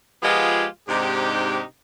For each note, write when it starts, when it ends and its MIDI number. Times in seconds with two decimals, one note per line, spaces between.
0.23 0.65 53
0.23 0.65 56
0.23 0.65 59
0.23 0.65 65
0.23 0.65 67
0.23 0.65 68
0.88 1.61 44
0.88 1.61 48
0.88 1.61 62
0.88 1.61 63
0.88 1.61 67